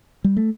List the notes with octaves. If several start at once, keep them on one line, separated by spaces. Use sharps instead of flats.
G3
A3